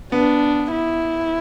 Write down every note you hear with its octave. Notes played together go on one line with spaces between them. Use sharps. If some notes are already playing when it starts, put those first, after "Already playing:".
B3 D4
E4